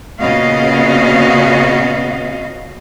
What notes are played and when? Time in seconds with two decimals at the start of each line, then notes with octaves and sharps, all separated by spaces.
0.20 A#2 C#3 B3 F#4 D#5 F5